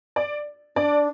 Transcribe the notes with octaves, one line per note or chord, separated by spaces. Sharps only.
D5
D4 D5